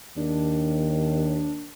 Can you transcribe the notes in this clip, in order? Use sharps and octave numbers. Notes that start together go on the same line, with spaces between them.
D#2 D4